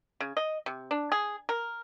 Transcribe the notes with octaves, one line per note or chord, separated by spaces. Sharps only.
C#3
D#5
C3
D4
G#4
A#4